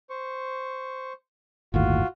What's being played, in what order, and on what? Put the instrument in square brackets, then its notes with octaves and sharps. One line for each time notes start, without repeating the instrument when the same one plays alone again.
[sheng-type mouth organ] C5 C#6
[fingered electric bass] G1 D#2 A2 [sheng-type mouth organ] F4 F#4